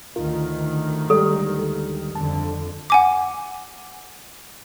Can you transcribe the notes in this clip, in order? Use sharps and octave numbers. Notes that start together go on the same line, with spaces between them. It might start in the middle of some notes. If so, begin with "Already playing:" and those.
D2 D#3 F4 A#4
G3 G#3 G4 A4
F2 D3 A5
F#5 G#5 D6